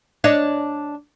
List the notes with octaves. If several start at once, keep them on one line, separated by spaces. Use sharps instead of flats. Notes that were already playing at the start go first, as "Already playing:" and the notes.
D4 C#5 D#5